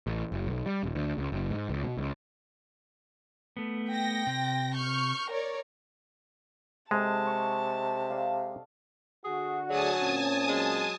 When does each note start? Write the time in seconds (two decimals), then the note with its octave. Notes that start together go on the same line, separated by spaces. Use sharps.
0.07 A1
0.32 F#1
0.47 B1
0.66 G3
0.83 D#1
0.95 D2
1.18 C#2
1.32 F#1
1.50 G#2
1.69 C#2
1.84 B2
1.98 C#2
3.57 A3 B3
3.89 G5 A#6
4.27 C3
4.74 C#6 F6 G6
5.30 A#4 C#5 D5
6.91 C3 G#3 A4 D#5 G#5 A5
7.26 C#6
8.10 D5 F5
9.25 D3 F#4 G#4
9.70 D2 F#3 G#4 D5 G#5 A5 D#6
10.01 A#2 C4 C#4
10.49 F#3 G#3